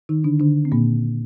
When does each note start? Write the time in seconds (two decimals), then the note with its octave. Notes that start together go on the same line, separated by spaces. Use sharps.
0.09 D#3 D#4
0.24 D3 D4
0.40 D3 D4
0.65 C4
0.72 A#2 A#3